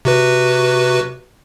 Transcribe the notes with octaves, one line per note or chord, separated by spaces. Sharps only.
C3 F#4 B4